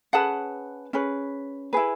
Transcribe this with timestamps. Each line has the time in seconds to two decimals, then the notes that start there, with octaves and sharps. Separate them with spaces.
0.13 C#4 G#4 B4 F#5 A5
0.93 C#4 G#4 B4
1.73 E4 G#4 B4